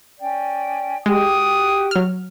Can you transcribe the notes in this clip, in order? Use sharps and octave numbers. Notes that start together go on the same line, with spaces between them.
C#4 D5 G5
G#3 F#4 G4 G5 D#6
F#3 F6